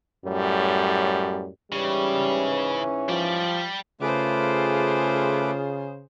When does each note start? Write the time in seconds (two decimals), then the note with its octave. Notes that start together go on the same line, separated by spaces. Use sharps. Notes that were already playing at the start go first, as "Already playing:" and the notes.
0.25 F#2 A2 G3
1.72 G#2 C#3 E3 G3 C#4
3.09 F3 G3 D5
4.01 C#3 A3 F4 G#4 B4 C5 D6